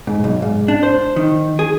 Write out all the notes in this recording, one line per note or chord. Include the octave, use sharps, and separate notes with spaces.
G#2
B1
G#2
D4
C5
D#3
G#4